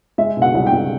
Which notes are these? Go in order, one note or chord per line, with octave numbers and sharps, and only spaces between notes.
G#3 E5
B2
F#5
C2
G5
C2